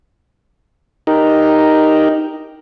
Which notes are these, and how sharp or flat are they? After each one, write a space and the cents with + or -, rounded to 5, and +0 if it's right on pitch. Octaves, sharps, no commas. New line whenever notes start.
D#4 +0 G4 +0 A#4 +0